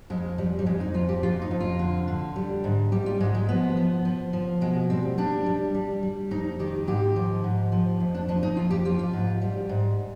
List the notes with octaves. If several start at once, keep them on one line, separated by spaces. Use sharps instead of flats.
F2 G#3
F3 G3
G3
F2 G#3
D#4
F3 F4
G4
F2 F4
D#4
F2
F4
D3
D3
G3
G#2
G3 G4
F4
G#2 G#3
G#3
F3 B3
F3
F3
F3
B2 G#3
G3 C4
G3 D4
G3
G3
G3
F2 D#4
D#3 G4
G#2 G4
F3
G#2
F3
F2
D4
F3 D4
D#4
F2 F4
G4
F3 F4
F4
G#2
G3
G#2